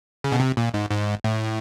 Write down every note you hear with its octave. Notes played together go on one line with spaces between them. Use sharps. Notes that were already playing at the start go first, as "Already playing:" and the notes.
C#3
B2
C3
A#2
G#2
G#2
A2